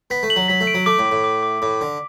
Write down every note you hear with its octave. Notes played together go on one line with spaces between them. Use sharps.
B3 B6
A3
F#7
F#3
F#3 B6
A3
D7
F#3
A3 D6
A2
D6
A2
D6
D6
A2 D6
D3 D6